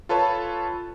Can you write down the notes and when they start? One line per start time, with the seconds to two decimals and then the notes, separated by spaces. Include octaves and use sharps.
0.09 F4 A4 B4 C#5 A5